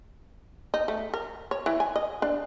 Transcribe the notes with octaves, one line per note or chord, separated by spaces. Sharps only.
D#4
A3
A#4
C#5
E3
G#5
D#5
D4